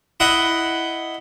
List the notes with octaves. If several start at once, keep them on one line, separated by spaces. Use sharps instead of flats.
E4 D#5 F#5